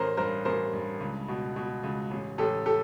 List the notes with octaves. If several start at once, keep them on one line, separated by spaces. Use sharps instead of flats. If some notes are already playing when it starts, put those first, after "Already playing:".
Already playing: A1 A#4 C5
G2 A#4 C5
A1 A#4 C5
G2
C#2
B2
B2
C#2
A1
A1 G4 A4
G4 A4